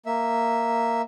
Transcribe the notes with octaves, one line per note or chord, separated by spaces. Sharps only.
A#3 E5